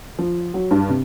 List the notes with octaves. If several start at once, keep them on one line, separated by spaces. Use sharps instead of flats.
F3
F#3
G2
C3